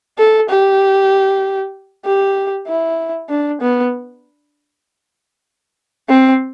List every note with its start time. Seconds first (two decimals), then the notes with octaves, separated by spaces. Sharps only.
0.18 A4
0.49 G4
2.05 G4
2.67 E4
3.29 D4
3.61 B3
6.09 C4